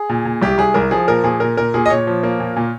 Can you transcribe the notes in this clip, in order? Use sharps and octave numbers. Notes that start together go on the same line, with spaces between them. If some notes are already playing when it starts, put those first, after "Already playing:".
Already playing: G#4
A#2
A#2
C2 G4
C2 G#4
C2 A#4
F3 G#4
A#2 A#4
A#2 G#4
A#2 A#4
A#2 A#4
A#2 G#4
D#5
A#2 C#5
F3
A#3
A#2
A#2